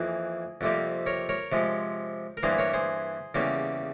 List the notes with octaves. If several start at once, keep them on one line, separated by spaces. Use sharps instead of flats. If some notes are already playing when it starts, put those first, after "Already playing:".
Already playing: F2 E3 A#3 G#4
F2 C3 G3 A#3
A#4 C#5
A#4 C#5
C3 F3 G#3
A#4
G2 E3 G3 A#3 G#4 C5
A#4 C#5
G#4 C5
E2 C#3 G3 A#3